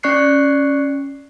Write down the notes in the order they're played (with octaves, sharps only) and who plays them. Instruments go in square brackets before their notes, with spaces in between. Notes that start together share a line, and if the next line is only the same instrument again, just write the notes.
[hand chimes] C#4 D5 C#6 F#6 C7 C#7